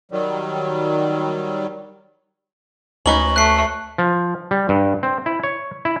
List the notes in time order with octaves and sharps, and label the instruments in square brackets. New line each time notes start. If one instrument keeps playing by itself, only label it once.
[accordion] D#3 F#3 G3
[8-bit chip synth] D2 [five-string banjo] C#4 D#4 B4 [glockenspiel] C#6 F#7
[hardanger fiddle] A3 [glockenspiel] F#6 C7
[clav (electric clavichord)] F3
G3
G2
C4
E4
C#5
E4